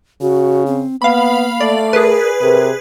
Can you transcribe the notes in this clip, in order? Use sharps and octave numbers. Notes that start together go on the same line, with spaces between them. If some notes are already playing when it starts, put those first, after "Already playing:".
C#3 F#4
C4
A#3 B3 F5 B5
A3 D5
G#4 A#4 B4
C3 A#4